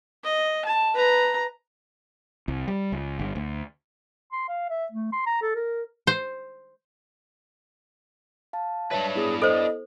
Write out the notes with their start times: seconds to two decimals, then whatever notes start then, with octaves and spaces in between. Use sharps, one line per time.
0.24 D#5
0.65 A5
0.94 B4 A#5
2.48 C2
2.68 G3
2.92 C#2
3.19 G1
3.36 D2
4.32 C6
4.48 F5
4.70 E5
4.92 A3
5.12 C6
5.26 A#5
5.42 A4
5.55 A#4
6.07 C5
8.53 F5 A5
8.91 D4 B4 C#5 E5 A5
9.15 B3 E4 G#4
9.42 A4 C5 D#5